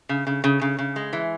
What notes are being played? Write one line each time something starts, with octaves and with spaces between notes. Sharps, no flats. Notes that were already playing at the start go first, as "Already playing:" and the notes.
C#3
C#3
C#3
C#3
C#3
G#3
E3